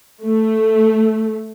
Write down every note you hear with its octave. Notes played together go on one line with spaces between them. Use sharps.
A3